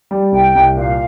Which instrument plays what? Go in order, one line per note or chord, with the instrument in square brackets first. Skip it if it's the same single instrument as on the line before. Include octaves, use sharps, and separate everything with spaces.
[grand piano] G3
[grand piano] C2 [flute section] G5
[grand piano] C2
[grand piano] A#2 [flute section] F5